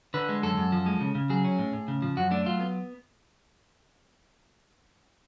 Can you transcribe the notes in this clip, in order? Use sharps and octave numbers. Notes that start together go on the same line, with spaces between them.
D3 B4
G#3
F#2 A4
F#2
F3
G#3
C#3
C#3
F#3 G#4
C#4
A2
A2
C#3
F3
F#2 F#4
A3 D4
F#3 F4
B3